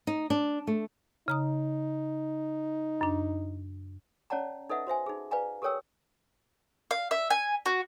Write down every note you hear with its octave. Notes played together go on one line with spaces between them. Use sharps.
D#4
D4
A3
C#3 D#4 A#5 D#6
F#2 D4
C#4 C#5 D5 F#5 A5 A#5
D#4 A4 B4 D#5 E5 F#5
F#4 C5 E5 G#5
D#4 G#4
B4 D5 F5 G#5 A#5
G4 A4 A#4 C#5 G5 E6
F5
E5
G#5
F#4